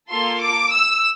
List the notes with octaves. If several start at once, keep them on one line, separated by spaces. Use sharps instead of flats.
A#3 F4 A4 C6
D6
E6